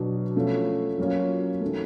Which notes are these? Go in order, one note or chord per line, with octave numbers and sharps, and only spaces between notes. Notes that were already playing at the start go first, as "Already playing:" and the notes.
Already playing: B2 F#3 B3 D4
F3 A3 C#4
F#3 A#3 C#4 F4
D#3 F#3 A3